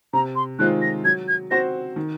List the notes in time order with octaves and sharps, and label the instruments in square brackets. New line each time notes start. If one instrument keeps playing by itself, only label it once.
[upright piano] C3 [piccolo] A#5
[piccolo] C6
[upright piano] D#3 G#3 C4 F4 [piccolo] F#6
[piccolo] A#6
[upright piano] F#3 [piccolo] G#6
[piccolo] G#6
[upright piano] C4 F#4 C5 [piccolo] A#6
[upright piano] D#3